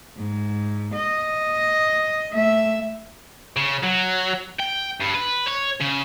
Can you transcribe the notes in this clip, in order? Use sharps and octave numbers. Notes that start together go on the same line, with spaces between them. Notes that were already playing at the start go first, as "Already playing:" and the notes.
G#2
D#5
A3 E5
C#3
F#3
G5
G2
B4
C#5
C#3